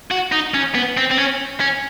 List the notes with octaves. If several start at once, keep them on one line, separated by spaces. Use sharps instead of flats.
F#4
D#4
C#4
B3
C4
C4
C#4
C#4